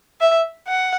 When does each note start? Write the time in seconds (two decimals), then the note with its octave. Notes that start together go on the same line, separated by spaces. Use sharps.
0.21 E5
0.68 F#5